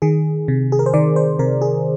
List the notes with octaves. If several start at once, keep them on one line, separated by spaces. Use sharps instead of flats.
D#3 G#4
C3
G#4
A#4
C5
D#3 D5
C5
C3 A#4
G#4